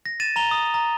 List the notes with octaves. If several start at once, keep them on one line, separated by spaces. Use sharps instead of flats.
A#6
A6 D#7 E7
A#5 F7 G7
D#6
A#5